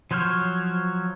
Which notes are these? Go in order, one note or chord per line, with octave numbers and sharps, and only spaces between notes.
F3 F#3 C5 C#5 F6